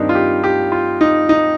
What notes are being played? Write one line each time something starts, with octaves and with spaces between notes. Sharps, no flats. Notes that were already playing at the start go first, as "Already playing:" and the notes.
Already playing: G2 D#3 C4 D4 D#4
F4
G4
G4
F4
D#4
D#4